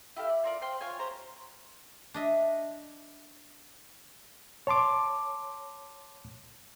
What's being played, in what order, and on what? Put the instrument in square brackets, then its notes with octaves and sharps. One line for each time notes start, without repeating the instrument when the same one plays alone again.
[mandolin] E4 G4 A4 F5
D5
F4 A#4 D5
C5 F5 G5 C6
F4 C#5 G#5
G4 C5 A#5
[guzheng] D4 D#5 E5
[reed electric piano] C#5 A5 C6 D6